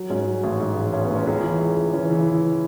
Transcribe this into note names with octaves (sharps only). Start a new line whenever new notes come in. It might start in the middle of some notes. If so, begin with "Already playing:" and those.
Already playing: F#3
G#2 C#4
F#3
A1
G#2
A1
A1 C#4
B3
A1
C#4
C#2
E3
C#2
C#2
E3 C#4
C#3 E3 E4
E3 E4